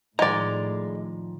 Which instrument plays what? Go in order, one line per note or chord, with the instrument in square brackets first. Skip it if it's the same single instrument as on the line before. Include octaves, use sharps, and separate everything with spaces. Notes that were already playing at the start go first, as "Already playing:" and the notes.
[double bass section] A2 [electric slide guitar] D#3 F3 A#5 [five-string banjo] G#3 D5